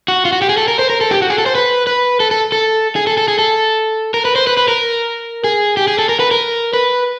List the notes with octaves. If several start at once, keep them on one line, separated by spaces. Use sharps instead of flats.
F#4
F4
F#4
G4
G#4
A4
A#4
C5
A#4
A4
G4
F#4
G#4
A4
C5
B4
B4
A4
A4
A4
G#4
A4
A4
G#4
A4
A#4
B4
C5
B4
B4
A#4
G#4
G4
G#4
A4
A#4
B4
A#4
B4